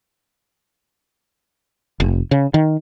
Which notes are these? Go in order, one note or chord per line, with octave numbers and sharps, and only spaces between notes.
F1
C#3
D#3